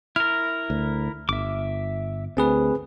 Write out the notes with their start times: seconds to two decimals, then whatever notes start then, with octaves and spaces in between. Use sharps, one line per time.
0.16 E4 A#4 F6
0.70 D2
1.29 G1 E5 D6
2.37 D2 C4 G#4 B4